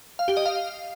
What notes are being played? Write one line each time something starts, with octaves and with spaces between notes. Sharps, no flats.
F5
G4
D#5
F5